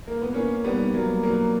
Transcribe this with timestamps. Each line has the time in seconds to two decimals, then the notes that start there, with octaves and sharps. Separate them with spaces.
0.07 A#3
0.21 B3
0.34 A#3 C#4
0.64 G3 B3
0.94 F#3 A#3
1.23 F#3 A#3